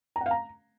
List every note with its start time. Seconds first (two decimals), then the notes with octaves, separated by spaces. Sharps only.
0.16 A#5
0.21 F#5
0.26 F5
0.31 A#5